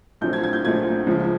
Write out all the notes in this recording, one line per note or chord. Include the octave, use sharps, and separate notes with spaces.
A#1 A#2 F#3 A3 C4 G6
G#6
G#6
G6
A#1 A#2 F#3 A3 C4 G#6
C#2 C#3 F3